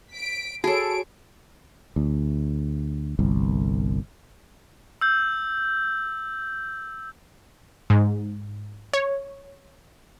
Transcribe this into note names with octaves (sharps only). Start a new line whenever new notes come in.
B6 D7
F#4 G#4 A4 C#5 A5 D7
D2
G1 C2
E6 G6
G#2
C#5